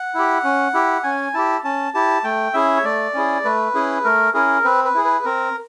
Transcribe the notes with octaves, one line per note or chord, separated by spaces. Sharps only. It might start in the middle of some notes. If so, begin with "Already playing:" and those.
Already playing: F#5
E4 G4
C#4
E4 G4
C#4 G#5
E4 G4 A5
C#4 A5
E4 G4 A5
A3 G5
C#4 E4 G#4 E5
C#5
A3 D5
C#4 E4 G#4
A3 B4
C#4 E4 G#4
A3 A#4
C#4 E4 G#4 A#4
C4 B4
B4
E4 G#4
B4
C4 A#4